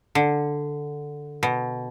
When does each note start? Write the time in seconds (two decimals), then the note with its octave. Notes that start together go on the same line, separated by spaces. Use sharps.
0.15 D3
1.43 B2